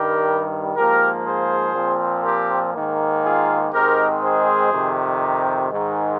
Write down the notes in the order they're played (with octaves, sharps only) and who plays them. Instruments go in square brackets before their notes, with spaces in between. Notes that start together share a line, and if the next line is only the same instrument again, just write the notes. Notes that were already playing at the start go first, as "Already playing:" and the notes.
Already playing: [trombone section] G2 D#3 G3 G4 A#4
G#2 F3 A#3 G4 A#4
G#4 C5
A#2 F3 C4
G4 A#4
G#2 D#3 A#3
F4 G#4
G#2 D#3 G#3 C4 G4 A#4
G#4 C5
F2 C3 D#3
G4 A#4
G#2 D#3 G#3